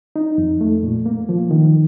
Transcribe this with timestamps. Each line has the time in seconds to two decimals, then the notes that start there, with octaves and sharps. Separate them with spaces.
0.16 D#4
0.38 F2
0.61 A3
0.83 A#2
1.06 A#3
1.29 F3
1.51 D#3